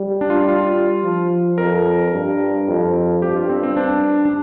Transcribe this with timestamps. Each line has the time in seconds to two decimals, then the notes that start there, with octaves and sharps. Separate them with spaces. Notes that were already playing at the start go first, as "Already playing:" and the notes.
Already playing: G3
0.21 D4
0.30 F4
0.39 D4
0.48 F4
1.03 F3
1.58 F2 A#4
2.13 G2
2.68 F2
3.22 G2 G4
3.36 F4
3.50 C4
3.63 C4
3.76 D4
4.25 D4